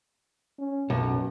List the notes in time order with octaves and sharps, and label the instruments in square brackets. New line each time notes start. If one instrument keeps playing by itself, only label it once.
[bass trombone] C#4
[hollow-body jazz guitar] B1 [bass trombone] F#2